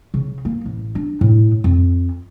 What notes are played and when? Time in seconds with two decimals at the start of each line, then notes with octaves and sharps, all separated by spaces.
0.14 C#3
0.45 A#3
0.66 A1
0.95 D4
1.21 A2
1.64 F2